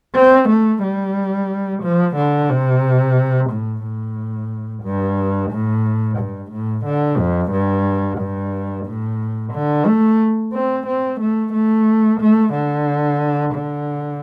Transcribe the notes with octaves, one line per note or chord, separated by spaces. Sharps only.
C4
A3
G3
F3
D3
C3
A2
A2
G2
A2
G2
A2
D3
F2
G2
G2
A2
D3
A3
C4
C4
A3
A3
A3
D3
D3